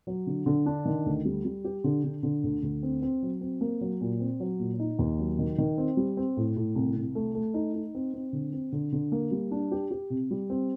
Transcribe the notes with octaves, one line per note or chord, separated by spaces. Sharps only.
F#3
D3
D3
D4
D#3
D2
G3
G3
G4
D3
D3
D3
D2
D2
C4
C4
F#3
C4
A#3
F#3
A#2
C4
F#3
A#2
D#4
D#2
F#3
D#3
D#3
C4
G3
C4
A2
A2
C2
C2
A3
A3
D#4
D#4
C4
C4
D3
C4
D3
D3
A#3
G3
D4
G4
G4
C3
G3
C4